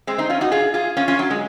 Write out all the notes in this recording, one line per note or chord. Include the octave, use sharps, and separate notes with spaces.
G#3 C4
C4 D#4
C#4 F4
D#4 F#4
F4 G#4
F4 G#4
C#4 F4
C#4 F4
F#3
G#3